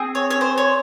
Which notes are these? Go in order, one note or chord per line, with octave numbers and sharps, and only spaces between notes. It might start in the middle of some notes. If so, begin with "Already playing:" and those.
Already playing: C4 G#4
C#5
C#5
C5
C#5